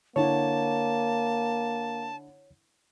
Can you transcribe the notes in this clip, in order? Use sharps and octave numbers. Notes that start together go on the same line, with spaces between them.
D3 A#3 D4 E4 C#5 A5